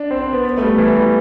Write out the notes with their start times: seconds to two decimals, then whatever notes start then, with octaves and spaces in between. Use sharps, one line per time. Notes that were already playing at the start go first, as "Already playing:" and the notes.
Already playing: D4
0.11 C4
0.22 C4
0.33 B3
0.44 B3
0.58 A3
0.62 G3
0.78 E3
0.96 G3